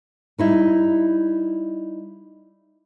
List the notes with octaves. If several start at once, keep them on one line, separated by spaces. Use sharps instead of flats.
G3 D#4 E4